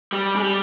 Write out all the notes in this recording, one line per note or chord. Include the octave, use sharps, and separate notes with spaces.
G3
G#3
G3